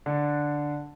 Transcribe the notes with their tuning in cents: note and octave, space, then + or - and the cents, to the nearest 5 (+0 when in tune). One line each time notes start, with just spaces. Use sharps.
D3 +0 D4 +0